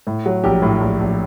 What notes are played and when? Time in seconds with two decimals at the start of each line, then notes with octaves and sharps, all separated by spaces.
0.07 A2
0.26 F#3
0.44 A#1 G4
0.62 A2
0.81 A#1
1.00 A#1